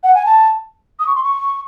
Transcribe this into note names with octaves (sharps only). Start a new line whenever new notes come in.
F#5
G#5
A5
D#6
C#6
C6
C#6